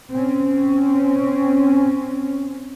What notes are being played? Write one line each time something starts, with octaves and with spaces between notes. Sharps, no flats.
C4 C#4